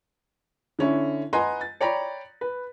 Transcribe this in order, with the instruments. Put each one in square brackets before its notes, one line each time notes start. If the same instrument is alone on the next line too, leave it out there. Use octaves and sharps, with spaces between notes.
[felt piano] D3 C#4 E4
B4 D#5 F#5 G#5 A#5 C6
A6
C#5 D5 G5 A#5 B5
B4